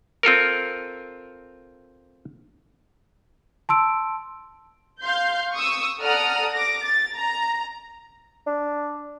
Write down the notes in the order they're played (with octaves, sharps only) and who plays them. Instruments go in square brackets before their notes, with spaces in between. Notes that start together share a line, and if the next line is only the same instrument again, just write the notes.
[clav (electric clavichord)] C4 F4 A4 A#4
[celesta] A5 C6 E6 D7
[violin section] F5 C6 G6
C#6 D#6 E6
A4 D5 F#5 A#5 D#6 F6
D6 A#6
A6
A#5
[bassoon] D4